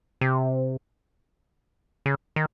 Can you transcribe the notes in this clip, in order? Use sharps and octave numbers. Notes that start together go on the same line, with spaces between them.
C3
C#3
D#3